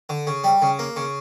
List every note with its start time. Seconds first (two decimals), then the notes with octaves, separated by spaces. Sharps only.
0.09 D3
0.27 C#3
0.44 G3
0.62 C#3
0.79 A#3
0.96 C#3